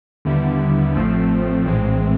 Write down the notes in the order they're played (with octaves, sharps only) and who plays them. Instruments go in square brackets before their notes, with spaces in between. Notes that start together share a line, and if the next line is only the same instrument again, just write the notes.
[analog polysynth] D#2 D3 G3 B3 E4
A1 A2 F3 A3 C4
A#1 A2 E3 G#3 C4